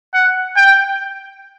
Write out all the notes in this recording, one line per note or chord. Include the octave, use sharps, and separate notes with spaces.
F#5
G5